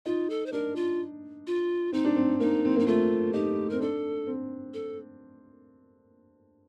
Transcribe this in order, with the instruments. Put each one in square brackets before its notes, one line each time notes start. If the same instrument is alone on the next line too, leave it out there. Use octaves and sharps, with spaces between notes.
[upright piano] D#4 [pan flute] F4
[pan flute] A4
C5
[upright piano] D4 [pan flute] A#4
[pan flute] F4
F4
[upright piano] C4 [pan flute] D#4
[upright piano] D4
C4
[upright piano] A#3 [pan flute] D#4
[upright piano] C4
[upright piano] A#3 [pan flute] D#4
[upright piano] A3 [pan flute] F4
[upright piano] D#4 [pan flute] G4
[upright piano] C4 [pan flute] A#4
[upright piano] D4 [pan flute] A4
[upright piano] C4
[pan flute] A4